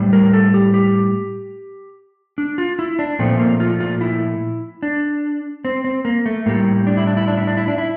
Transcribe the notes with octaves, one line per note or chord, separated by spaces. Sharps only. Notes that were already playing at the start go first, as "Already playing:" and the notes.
Already playing: A2 G3
A#4
A4
G4
G4
D4
F4
E4
D4
A#2 F3 A3 C4
A#3
F4
F4
E4
D4
C4
C4
A#3
A3
A2 G3 A#3
D4
E4
D4
E4
D4
E4
D4
E4
D4
E4